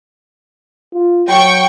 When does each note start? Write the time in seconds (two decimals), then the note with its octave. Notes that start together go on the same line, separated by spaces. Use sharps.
0.93 F4
1.29 F#3 G5 C#6